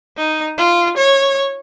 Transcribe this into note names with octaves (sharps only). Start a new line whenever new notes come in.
D#4
F4
C#5